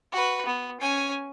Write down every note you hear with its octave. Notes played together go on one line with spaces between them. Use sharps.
F#4 B4
B3
C#4 G#5